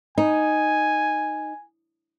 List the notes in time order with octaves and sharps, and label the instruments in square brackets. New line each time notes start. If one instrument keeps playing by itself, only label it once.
[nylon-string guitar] D#4 [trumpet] G#5